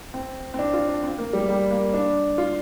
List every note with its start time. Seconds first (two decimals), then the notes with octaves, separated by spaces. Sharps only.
0.14 C4
0.54 C4
0.59 D4
0.74 F4
0.88 D4
1.03 C4
1.18 A#3
1.33 G3
1.49 G3
1.71 A#3
1.94 D4
2.38 F4